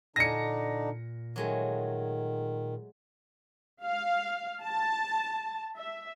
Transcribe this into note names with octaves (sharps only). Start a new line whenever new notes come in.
A#2 D3 D4 D#4 G#5 A5 A#6 C#7
D#3 F#3 G#3 A3
F5
A5
E5